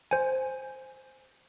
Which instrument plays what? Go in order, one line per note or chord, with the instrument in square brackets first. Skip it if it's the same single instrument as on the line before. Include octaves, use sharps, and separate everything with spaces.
[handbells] C5 G#5